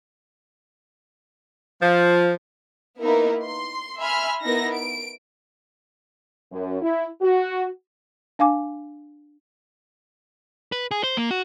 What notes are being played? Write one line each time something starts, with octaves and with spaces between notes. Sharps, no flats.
F3
A#3 B3 D#4 E4 A#4 B4
C6
E5 G#5 B5 C6 F6
B3 D#4 E4 A#4 A#6
D7
F#2
E4
F#4
D4 F5 G#5 D6
B4
G#4
C5
A#3
F#4